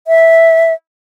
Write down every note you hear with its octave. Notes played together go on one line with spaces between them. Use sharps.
E5